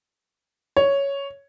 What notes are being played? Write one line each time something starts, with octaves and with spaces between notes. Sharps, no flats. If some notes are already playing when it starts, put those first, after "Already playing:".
C#5